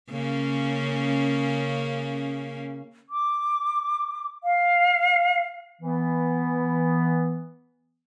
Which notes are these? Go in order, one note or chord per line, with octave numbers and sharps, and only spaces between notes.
C#3 A#3 C#4
D6
F5
E3 B3